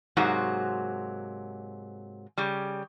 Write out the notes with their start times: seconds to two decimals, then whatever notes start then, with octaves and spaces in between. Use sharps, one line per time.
0.17 G#2 C3 F#3 A#3 F#4
2.38 C#3 G3